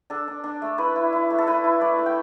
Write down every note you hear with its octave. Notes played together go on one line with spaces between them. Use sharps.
D4 A4
D4
D4
A3
E4 B4
E4
E4
A3
A4
E4 B4
E4
A3 D5
A3
G5